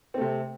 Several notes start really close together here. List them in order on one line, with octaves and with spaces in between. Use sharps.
C4 A3 C3